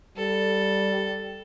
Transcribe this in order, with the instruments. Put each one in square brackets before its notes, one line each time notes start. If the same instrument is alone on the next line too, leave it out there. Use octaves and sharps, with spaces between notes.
[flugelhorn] G3 [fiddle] A4